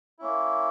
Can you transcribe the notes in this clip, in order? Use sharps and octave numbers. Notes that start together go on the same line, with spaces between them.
A#3 C#4 E4